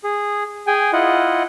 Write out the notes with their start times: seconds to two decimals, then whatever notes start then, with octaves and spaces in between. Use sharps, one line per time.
0.04 G#4
0.67 G#4 G5 G#5
0.93 E4 F4 D#5 F#5